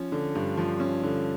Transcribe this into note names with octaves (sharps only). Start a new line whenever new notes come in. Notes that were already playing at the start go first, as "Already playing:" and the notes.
Already playing: F3 C#4
D3
G2
F3
C#4
D3